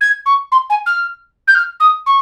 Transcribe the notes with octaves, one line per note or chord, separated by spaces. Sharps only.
G#6
C#6
C6
G#5
F6
G6
F6
D#6
C#6